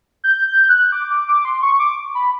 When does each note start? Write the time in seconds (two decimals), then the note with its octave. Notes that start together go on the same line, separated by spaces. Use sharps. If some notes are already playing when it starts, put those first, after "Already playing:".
0.24 G6
0.47 G6
0.69 F#6
0.92 D6
1.11 D6
1.28 D6
1.45 C6
1.63 C#6
1.79 D6
2.15 B5